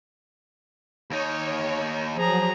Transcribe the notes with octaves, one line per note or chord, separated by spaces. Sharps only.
D#2 D#4 C#5
F3 F#3 G#4 A#5